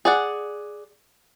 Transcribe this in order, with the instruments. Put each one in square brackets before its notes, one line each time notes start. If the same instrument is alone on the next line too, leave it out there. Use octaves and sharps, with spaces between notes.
[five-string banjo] G#4 D5 F#5